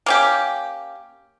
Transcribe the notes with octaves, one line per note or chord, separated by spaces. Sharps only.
A#3 C#4 G4